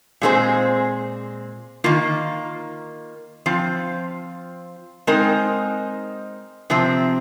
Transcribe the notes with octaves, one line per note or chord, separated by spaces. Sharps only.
A#2 G#3 C4 G#4 C5
D#3 A#3 F4
F3 C4 F4
G#3 C4 D#4 A#4
C3 F3 C4